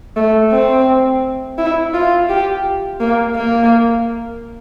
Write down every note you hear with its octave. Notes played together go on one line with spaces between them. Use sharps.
A3
C4
E4
F4
G4
A#3
A#3